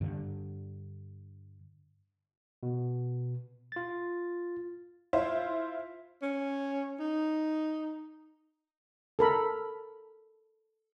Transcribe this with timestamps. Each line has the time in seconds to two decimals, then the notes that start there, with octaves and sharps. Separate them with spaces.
0.01 G2 D3
2.63 B2
3.72 F4 A6
5.13 E4 F4 C5
6.22 C#4
7.00 D#4
9.19 A4 A#4 B5